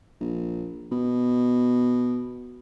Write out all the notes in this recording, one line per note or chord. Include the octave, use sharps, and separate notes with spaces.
A#1
B2